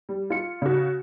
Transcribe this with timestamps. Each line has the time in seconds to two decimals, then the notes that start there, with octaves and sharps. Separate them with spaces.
0.09 G3
0.30 F4 C#7
0.62 C#3 F#4